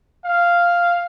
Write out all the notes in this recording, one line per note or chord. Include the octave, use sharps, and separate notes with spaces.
F5